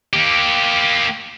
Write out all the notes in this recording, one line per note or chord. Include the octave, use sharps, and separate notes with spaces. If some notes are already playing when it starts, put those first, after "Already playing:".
A#3 G4